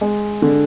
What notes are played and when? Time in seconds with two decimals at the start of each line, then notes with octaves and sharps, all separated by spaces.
0.01 G#3
0.42 D3